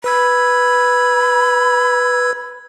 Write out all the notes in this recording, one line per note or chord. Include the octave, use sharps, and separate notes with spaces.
B4 B5 E6 G#6